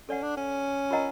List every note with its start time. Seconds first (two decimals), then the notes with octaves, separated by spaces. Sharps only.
0.09 C#4 A4 D5 F#5
0.23 D4
0.37 C#4
0.91 F4 A#4 D#5 F#5 A#5